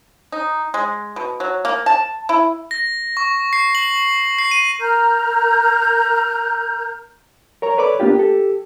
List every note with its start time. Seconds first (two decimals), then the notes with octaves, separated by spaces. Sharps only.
0.32 D#4
0.74 G#3
1.16 B2
1.40 F#3
1.65 A#3
1.86 A5
2.29 E4
2.71 A#6
3.17 C#6
3.53 C7
3.75 F#7
4.39 C7
4.51 D#7
4.81 A#4 A#5 F6 G6
7.62 A#4 C#5 A#5
7.78 A4 B4 C#5 D5 B5 D6
8.00 A#3 B3 D4 F4 G4
8.15 G4 A4